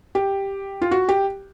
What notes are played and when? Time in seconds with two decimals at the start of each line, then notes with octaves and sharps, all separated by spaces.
0.15 G4
0.82 F4
0.91 F#4
1.09 G4